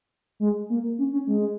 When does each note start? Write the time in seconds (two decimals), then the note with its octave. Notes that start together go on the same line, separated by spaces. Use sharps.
0.40 G#3
0.70 A#3
0.99 C#4
1.12 C#4
1.27 G#3